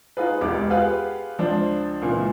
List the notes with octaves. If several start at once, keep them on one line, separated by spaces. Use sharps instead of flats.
D#4 F4 G#4 B4
E1 C#2 G4 D6
F4 G4 G#4 B4 F5 F#5
C#2 F3 D4 C5
C#2 A#2 C#3 E3